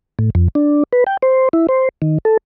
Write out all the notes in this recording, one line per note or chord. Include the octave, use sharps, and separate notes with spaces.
A2
F2
D4
B4
G5
C5
E4
C5
D#3
A4